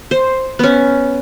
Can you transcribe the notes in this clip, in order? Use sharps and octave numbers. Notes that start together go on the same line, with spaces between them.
C5
B3 C#4